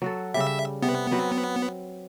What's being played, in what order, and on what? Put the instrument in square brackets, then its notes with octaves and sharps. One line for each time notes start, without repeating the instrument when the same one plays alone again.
[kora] F#3 F#4 A4
[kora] C#3 G3 [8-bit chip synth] E5
[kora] C3 [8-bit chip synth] B3
[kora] F#3 C4 B4